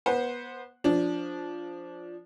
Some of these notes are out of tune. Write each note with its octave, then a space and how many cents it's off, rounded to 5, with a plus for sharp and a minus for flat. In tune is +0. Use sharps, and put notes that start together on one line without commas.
B3 -25 C5 +0 F#5 -10
F3 +0 D4 -10